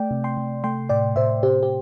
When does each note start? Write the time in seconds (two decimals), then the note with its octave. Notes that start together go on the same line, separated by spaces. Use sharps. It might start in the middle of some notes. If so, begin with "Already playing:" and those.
Already playing: A3 D5 G5
0.11 C3
0.24 G5 C6
0.37 C3
0.64 A3 G5 C6
0.89 A2 D5 G5
1.16 A2 C5 E5
1.43 C3 G4 C5
1.63 G4